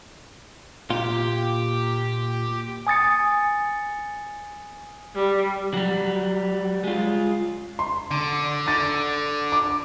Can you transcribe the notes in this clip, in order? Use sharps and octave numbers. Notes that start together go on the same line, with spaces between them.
A#2 F4 G4
G#5 D#6 A6 C#7
G3
F#3 G3
G#3 F4
C6
D3
D3 A6
D6